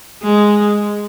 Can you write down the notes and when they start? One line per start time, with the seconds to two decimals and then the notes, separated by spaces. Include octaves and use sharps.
0.23 G#3